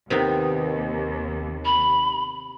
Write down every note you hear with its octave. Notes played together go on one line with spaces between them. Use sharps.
D#2 C3 D#3 B3
B5